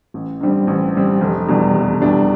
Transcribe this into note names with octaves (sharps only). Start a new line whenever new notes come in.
A1
G2 D3 G3 C4
A1
G2 D3 G3 C4
F1
E2 B2 G3 D4
F1
E2 B2 G3 D4